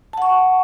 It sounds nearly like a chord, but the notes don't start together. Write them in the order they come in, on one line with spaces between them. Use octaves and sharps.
A5 F#5 C#6